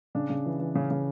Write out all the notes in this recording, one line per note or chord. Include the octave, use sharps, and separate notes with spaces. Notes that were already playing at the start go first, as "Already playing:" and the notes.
C#3 D4
C#3
E3
E3
C#3 C#4
C#3